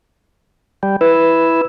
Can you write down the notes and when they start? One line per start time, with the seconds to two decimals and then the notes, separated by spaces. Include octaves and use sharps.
0.83 G3
1.01 E4 B4